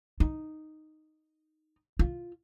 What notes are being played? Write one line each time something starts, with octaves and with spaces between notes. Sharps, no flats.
D#4
F4